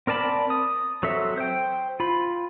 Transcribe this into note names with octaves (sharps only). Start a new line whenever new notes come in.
C4 A#4 D5 A5 B5
D#6
F#3 C4 A4 E5
C5 G5
F4 B5